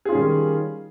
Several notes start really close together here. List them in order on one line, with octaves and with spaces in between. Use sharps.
G#4 F4 C#4 G3 D#3